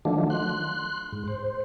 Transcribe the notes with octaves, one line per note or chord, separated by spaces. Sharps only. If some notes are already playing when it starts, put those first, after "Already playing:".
D#3 F3 F#3 A3 D4
C6 F#6
G#2
C5